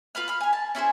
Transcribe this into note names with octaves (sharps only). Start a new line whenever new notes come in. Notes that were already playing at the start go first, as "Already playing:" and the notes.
F4 B4 B5 F6
B5 F6
G#5 F6
A5
C#4 E4 G#4 C5